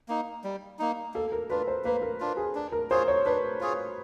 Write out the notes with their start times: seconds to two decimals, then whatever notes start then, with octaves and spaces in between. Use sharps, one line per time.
0.08 A#3 D#4
0.44 G3
0.79 A#3 D#4
1.14 A#3 A4
1.32 A#4
1.50 D4 F4 B4
1.68 C5
1.84 A#3 B4
2.02 A#4
2.20 D4 F4
2.37 G#4
2.55 D4
2.72 A#4
2.90 F4 G#4 C5 C#5
3.08 C#5
3.26 D4 B4
3.60 F4 G#4 C#5